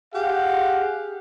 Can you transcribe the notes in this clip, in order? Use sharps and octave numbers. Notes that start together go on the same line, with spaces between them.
G4 G#4 F5 F#5